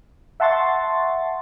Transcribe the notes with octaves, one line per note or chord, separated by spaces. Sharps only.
E5 F#5 A5 C6 C#6 A6